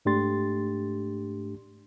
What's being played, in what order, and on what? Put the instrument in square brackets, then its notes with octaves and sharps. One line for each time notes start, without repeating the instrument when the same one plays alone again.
[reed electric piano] G#2 A3 D4 G4 C6 A6